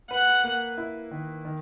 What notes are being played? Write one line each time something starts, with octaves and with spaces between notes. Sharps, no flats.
B4 F#5
A#3
E4
D#3
D#3